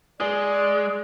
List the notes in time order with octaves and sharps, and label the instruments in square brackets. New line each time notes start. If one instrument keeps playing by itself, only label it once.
[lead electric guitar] G#3 [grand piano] G#4 [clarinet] D5